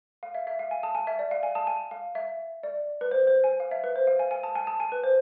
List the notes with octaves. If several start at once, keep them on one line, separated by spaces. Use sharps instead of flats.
F5
E5
E5
F5
G#5
A5
G#5
E5
D5
F5
G#5
A5
G#5
F5
E5
D5
B4
C5
C5
G#5
F5
E5
B4
C5
F5
G#5
G#5
A5
G#5
A5
G#5
B4
C5